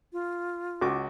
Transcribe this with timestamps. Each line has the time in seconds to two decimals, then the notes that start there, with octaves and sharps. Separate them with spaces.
0.13 F4
0.81 C#2 F#4 D6